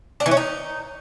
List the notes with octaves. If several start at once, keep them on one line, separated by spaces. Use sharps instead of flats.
D4
E3
C#4
D#4